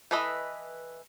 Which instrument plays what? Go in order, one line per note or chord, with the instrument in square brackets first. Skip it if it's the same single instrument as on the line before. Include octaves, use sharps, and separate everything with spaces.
[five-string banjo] E3 A4 B4 D#5 E5